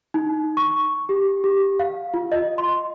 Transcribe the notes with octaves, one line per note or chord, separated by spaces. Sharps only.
D#4
C#6
G4
G4
F5
F4
D#5
C6